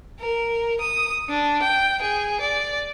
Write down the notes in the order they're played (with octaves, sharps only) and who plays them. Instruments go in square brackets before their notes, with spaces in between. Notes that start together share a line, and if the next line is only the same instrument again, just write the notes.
[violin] A#4
D#6
D4
G5
G#4
D5